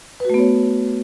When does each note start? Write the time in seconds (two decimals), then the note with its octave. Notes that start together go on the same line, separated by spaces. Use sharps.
0.20 B4
0.25 F#4
0.30 A3
0.34 B3
0.39 C#5